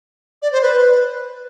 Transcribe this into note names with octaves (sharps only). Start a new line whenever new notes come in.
D5
C5
B4